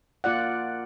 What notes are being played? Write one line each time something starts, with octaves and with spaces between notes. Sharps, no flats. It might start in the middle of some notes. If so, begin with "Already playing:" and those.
A#3 F4 D5 F#5